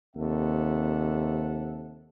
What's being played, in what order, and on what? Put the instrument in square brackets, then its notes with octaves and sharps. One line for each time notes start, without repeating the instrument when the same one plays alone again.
[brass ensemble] D#2 C3 C4 A4 E5 F#5